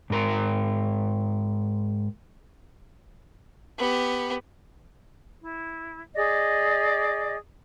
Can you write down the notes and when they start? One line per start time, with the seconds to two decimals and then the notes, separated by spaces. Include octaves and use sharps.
0.10 G#2 A#4 A#5
3.78 B3 G4
5.39 E4
6.15 G#4 D5 D#5